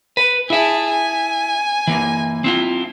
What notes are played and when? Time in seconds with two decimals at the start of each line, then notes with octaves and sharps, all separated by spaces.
0.17 B4
0.50 E4 G#4 E5 A5
0.91 G#5
1.87 E3 A#3
2.44 C4 E4 F4